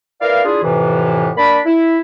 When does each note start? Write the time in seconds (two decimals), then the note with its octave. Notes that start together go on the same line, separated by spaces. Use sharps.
0.21 E4 A#4 B4 D5 F5
0.45 D4 E4 F4 G#4
0.63 F2 A2 C3 E3
1.37 A#3 D4 D5 B5
1.66 E4